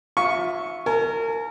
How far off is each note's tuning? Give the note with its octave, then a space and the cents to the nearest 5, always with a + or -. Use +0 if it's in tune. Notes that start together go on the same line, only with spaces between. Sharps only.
F4 +25 E5 +0 C#6 +0
A#4 -30 G#5 +30